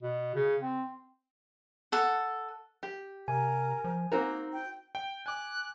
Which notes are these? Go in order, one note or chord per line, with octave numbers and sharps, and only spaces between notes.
B2
C#3
C4
A4 F#5
G4
C3 A#4 G#5
F3
A#3 C4 D#4 F#4 A#4
G5
G5
G#5 D6 F#6